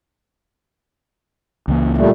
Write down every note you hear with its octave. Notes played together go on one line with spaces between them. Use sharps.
C#2 E3 A#3
A#2 G3 A3